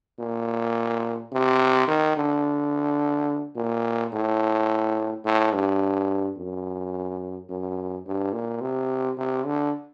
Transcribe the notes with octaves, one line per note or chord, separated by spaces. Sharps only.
A#2
C3
D#3
D3
A#2
A2
A2
G2
F#2
F#2
G2
A#2
C3
C3
D3